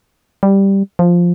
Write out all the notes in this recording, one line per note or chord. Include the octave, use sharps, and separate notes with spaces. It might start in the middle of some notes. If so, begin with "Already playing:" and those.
G3
F3